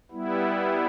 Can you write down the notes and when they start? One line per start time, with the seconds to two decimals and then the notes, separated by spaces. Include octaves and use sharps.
0.11 G3 B3 E4